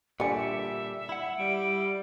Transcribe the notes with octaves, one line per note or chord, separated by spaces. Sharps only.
A#2 D3 G3 D4 G#5 C#7
E5
E4 F#5
G3 D7